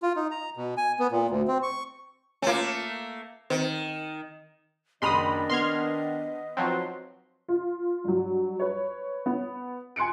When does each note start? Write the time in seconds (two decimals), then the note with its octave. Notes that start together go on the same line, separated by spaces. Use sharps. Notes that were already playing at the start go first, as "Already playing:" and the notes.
0.03 F4
0.16 D#4
0.31 A#5
0.57 B2
0.77 G#5
0.99 B3
1.12 A#2
1.30 D2
1.48 C4
1.63 C#6
2.42 A3 A#3 C#4 F4
3.50 D#3 C4
5.02 F#1 D#3 D4 D#5 B5 C6 D#6 F7
5.50 B3 C6 F6 G#6
6.57 F3 F#3 C4 D#4 B4 C6
7.48 F4
8.04 G2 F#3
8.60 B4 C#5
9.26 B3
9.96 G#5 C6 F#6 C#7 D7